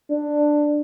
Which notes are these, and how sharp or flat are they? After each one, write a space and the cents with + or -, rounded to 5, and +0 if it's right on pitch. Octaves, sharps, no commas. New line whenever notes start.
D4 +10